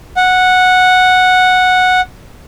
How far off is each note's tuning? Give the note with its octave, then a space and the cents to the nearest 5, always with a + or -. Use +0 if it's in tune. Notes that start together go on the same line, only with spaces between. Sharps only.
F#5 -10